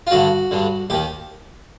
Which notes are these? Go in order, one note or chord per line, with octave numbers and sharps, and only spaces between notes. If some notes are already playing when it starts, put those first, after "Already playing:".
F4
G2 D3 F#4
G2 D3
D#2 D#3 G4